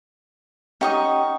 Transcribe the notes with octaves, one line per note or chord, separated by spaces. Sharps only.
C#4 D#4 G4 F#5 C#6 D#6